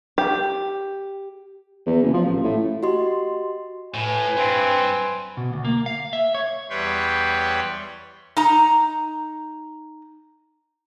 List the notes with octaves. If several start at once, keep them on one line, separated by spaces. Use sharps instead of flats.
G4
E2
F#1
F3
A1
A2
F#4 G4 D#5 C6
A2 B4 G#5
G2 C4
B2
D2
A#3
F5
E5
C#5
E2 G3 B4 C#5 G5 C6
D#4 A#5